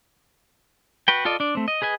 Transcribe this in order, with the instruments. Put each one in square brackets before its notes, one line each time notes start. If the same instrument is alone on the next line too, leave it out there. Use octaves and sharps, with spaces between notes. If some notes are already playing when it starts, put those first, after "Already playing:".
[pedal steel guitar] F#4 B4 G5
F4 A4 D5 D#5
D4 D5
A3 C4
D#5
G#4 B4 D#5 G#5